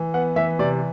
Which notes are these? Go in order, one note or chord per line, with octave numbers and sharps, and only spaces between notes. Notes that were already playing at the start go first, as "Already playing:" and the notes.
Already playing: E3
B3 F#5
E3 E5
C3 D5